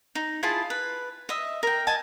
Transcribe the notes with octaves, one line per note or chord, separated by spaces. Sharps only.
D#4
E4 F4 G#4 A5
B4
D#5 E5
A#4 G5
D#5 G#5 A5